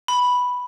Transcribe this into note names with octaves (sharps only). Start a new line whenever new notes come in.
B5